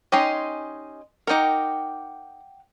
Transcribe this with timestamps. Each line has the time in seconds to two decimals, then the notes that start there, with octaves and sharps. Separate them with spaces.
0.12 C#4 D#4 G4 D#5 G#5 C6
1.27 D#4 A#4 F#5 G5 D6